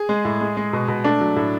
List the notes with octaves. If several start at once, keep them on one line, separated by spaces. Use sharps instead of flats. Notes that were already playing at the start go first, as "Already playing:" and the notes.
Already playing: G#4
G#3
A2
G#3
G#3
B2
B2
A3 D4
F#3
A2